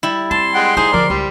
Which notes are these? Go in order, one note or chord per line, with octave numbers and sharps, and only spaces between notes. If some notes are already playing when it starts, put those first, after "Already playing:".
G3 E4
C4 A5 C6
G#3 F#5 G5
D#4 E4 G#4 C5
D3 F3 A#4 D5
C#2 G3